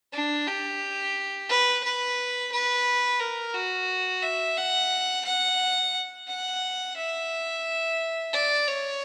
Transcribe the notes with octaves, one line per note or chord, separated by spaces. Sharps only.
D4
G4
B4
B4
B4
A#4
F#4
E5
F#5
F#5
F#5
E5
D5
C#5